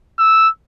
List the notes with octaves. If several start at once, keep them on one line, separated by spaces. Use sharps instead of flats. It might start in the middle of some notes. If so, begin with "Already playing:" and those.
E6